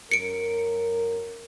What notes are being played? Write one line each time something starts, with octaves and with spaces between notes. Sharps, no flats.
F#2 A#4 C#7 D7